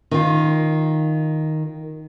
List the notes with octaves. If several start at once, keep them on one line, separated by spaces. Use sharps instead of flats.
D#3 F4